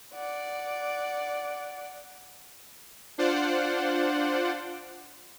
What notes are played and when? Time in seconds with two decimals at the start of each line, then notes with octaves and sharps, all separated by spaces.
0.14 D5 F#5
3.18 D4 F4 C5 D5 F#5